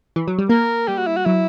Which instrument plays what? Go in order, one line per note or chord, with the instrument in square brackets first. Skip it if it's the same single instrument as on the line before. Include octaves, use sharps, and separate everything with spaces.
[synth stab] E3
F#3
G3
[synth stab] A#3 [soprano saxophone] A#4
[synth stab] G3 [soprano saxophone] G4
[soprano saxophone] F#4
E4
F#4
[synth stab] F#3 [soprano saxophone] E4